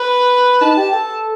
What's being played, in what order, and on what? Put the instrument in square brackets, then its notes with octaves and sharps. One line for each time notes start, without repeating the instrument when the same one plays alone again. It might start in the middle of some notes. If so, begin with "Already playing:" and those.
Already playing: [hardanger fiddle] B4
[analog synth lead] D#4 [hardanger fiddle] A5
[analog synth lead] G4
A4